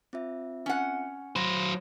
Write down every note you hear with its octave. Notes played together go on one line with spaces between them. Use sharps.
C4 F4 E5
C#4 F#5
F#3 C5 B5 A#6